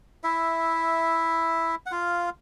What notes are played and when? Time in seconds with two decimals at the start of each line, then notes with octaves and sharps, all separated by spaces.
0.24 E4 E5
1.86 F#5
1.92 F4 F5